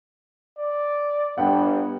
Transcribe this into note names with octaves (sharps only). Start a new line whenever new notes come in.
D5
G1 G2 B3 F#5 G5